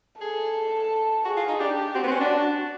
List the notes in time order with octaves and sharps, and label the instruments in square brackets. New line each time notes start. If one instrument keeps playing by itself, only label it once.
[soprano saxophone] G#4 [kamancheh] A4
[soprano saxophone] F#4 [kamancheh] G#4
[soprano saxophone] F4
D#4
[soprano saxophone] D4 [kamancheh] G4
[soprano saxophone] C4 [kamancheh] F#4
[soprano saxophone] B3
C4
C#4
D4